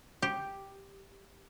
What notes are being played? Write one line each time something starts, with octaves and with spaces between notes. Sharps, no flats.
G4